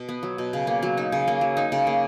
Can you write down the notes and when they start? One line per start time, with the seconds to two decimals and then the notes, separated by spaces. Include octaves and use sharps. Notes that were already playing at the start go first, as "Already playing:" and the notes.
Already playing: B2
0.09 B3
0.23 F#3
0.38 B2
0.53 C#3
0.67 A#3
0.83 F#3
0.97 D#4
1.12 C#3
1.28 A#3
1.41 F#3
1.57 D#4
1.72 C#3
1.87 A#3